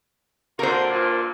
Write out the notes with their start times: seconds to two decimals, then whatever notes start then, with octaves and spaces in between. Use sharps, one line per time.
0.59 D3 A#3 F#4 A#4 C5
0.91 G2 A#2